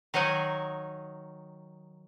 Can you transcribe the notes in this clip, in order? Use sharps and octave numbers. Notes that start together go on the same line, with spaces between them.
D#3 F#3 D#4 F#5 G#5